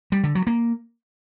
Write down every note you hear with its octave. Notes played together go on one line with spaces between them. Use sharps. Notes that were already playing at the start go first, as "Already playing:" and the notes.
G3
D3
F#3
A#3